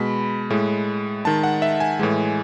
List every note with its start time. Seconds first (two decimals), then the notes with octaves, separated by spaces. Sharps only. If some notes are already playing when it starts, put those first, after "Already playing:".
Already playing: B2 G#3 B5
0.50 A2 G#3
1.25 D#3 G#3 A5
1.43 F#5
1.62 E5
1.80 G#5
1.99 A2 E3 G#3